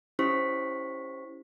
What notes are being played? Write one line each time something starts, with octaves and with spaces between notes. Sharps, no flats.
C#4 E4 G4 C5 C#6 B6